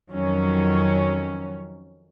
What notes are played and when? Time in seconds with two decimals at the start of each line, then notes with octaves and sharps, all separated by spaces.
0.10 F2 D#3 F#3 C#4